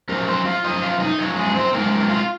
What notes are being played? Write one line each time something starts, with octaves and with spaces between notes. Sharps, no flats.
F#2 F3 A#4
C4 C5
F4 F5
F#2 F3 D#5
F4 F5
D#4 D#5
F#2 F3 C#5
G#3 G#4
C4 C5
F#2 F3 G#3 C4 A#4
A#3 A#4
F4 F5